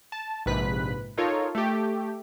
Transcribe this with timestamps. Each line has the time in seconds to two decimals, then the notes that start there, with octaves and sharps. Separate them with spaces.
0.12 A5
0.46 A#1 G#2 C3 B4 F#6 B6
1.18 D#4 F4 A4 A#4 C#5
1.55 A3 G4